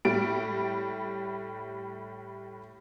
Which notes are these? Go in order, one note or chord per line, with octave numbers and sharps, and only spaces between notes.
A2 G3 D7